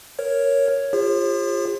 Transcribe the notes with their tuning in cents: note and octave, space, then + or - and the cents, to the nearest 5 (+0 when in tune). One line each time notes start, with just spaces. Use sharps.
A#4 +0 C#5 +0
F4 +0 G#4 -45 C5 +45